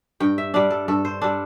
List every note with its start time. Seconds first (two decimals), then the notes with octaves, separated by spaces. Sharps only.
0.20 G2 G5
0.38 E5
0.54 G3 D4 D5
0.70 A4
0.88 G2 A4
1.05 C5
1.22 G3 D4 A4